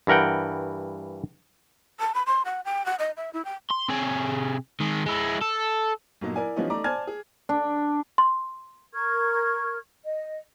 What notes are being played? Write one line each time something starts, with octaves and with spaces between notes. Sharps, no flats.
G2 E3 A#4 F#5 G5
A5
B5
C6
F#5
G5
F#5
D#5
E5
E4
G5
C6
C3 G#4
D#3 G#3
G#3 E4
A4
G1 A#2 F#3 D#4 D#5
E4 A#4 D5 G#5
E3 F3 G3 B3 C#4 D#4
A3 D#4 D5 A#5 D6
C5 D5 G#5 A5 F6 G#6
G#4
D4
C6
A#4 C#6 F6 G#6
D#5